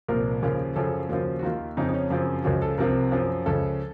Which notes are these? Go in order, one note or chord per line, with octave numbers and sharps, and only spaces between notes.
C2 A#2 F3 A#4
D#2 C#3 F3
F#2 C#3 F3 A4
D#2 C#3 F3 F#4
F#4
D#2 D#3 F4
F2 C#3 F3 D#4
D#4
C#4
F#2 C#3 F3 C4
C#2 C#3 F3 F#4
A4
C2 C3 F3 A#4
F#2 F3
C#2 C#3 F3 A4